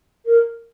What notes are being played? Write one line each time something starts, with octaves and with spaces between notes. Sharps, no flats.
A#4